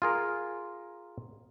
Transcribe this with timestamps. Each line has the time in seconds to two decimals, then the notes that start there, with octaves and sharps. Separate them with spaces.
0.02 F4 G#4 A#4